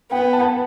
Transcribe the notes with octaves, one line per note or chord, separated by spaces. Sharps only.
B3 G5
A5